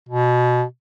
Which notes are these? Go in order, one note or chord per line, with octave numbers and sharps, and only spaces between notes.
B2